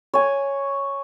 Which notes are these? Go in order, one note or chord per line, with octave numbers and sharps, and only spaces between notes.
C#5 G#5